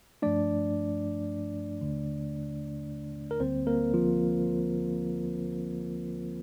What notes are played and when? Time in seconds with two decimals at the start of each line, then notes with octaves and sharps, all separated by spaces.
0.22 G2 F3 A3 D4 D5
1.81 D#2 D3 A3
3.31 A#4
3.40 D2 D3 G3 A#3 C4 C5
3.67 A#3 A#4
3.94 F3 F4